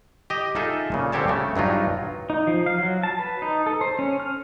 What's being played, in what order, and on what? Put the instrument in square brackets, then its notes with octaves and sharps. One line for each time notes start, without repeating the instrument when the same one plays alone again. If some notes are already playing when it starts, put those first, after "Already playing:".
[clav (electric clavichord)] G4 D#5
D#4 F4 G#4 A4 E5
A#2 C#3
D3 C4 G4 C#5 A5
C#3 A3
G2 F#3 D#4 F4
[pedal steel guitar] D#4
F3
F5
F#3
A5
B4
D#4
A4
C5
C#4
F6